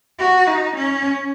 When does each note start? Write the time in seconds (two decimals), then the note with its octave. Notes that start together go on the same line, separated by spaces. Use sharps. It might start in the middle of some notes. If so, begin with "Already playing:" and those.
0.19 F#4
0.47 D#4
0.76 C#4